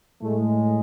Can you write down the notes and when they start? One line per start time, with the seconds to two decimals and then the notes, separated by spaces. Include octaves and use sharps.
0.22 A2 G#3 A3